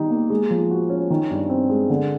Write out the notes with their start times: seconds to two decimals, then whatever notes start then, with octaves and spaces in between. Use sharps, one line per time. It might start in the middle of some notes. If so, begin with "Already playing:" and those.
Already playing: D#3 G3 D#4
0.10 A#3
0.30 G#3
0.50 F3
0.71 F#4
0.90 C#4
1.10 D#3
1.31 G2
1.49 C4
1.70 G#3
1.90 D3